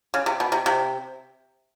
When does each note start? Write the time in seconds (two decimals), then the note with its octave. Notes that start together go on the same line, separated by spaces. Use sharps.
0.14 C#3
0.26 C3
0.40 B2
0.52 C3
0.66 C3